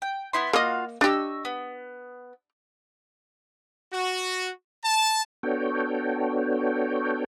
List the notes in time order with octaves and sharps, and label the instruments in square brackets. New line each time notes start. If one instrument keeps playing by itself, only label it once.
[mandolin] G5
B3 E4 C6
[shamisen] A#3 D#5 [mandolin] F4 F#4 F5
[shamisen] D4 G4 [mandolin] D#5 C#6 E6
[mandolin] B3
[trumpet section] F#4
A5
[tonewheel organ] B3 D4 F#4 A4 C#5 G5